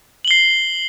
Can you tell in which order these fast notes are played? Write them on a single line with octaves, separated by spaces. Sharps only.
F#7 G7 C7